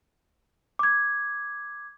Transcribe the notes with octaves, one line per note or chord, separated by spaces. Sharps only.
D6 G#6